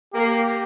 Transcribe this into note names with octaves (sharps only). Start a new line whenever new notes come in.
A#3 G4